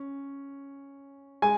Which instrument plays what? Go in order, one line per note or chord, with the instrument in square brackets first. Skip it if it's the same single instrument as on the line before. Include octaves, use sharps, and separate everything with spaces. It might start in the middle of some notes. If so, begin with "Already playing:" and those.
Already playing: [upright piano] C#4
G#3 G#5